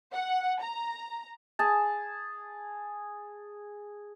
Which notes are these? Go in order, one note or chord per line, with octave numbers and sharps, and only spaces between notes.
F#5
A#5
G#4 A5